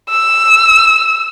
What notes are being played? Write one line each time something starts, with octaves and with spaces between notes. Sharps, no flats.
E6